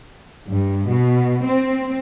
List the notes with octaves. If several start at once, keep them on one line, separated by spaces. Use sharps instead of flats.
G2
B2
C4